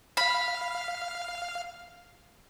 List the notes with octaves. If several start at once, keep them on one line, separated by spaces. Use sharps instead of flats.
F5 B5 F6